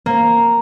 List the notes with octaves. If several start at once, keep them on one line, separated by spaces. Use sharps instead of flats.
A#3